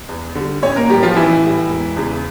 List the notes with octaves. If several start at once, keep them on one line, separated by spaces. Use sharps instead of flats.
E2
D3 G3
A1 C#4 C#5
A#3 A#4
A2 E3 G3 G4
F3 F4
A1 E3 E4
A2 G3
E1
E2 C#3